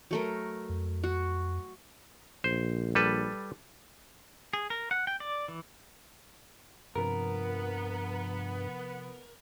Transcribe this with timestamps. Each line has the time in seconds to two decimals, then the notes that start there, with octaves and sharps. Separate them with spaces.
0.11 F#3 A3 A#4
0.70 F2
1.04 F#4
2.44 A#1 C5
2.95 G3 A4 B4
4.53 G#4
4.70 A#4
4.91 F#5
5.07 G5
5.20 D5
5.48 E3
6.96 G2 C3 F3 B3 A#4